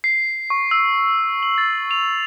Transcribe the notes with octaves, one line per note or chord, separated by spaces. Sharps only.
C7
C#6
E6
F#7
A6
F7